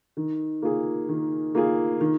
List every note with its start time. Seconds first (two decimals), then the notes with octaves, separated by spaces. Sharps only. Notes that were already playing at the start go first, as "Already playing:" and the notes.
0.17 D#3
0.62 A#3 F4 G#4
1.09 D#3
1.55 A#3 F4 G#4
2.01 D#3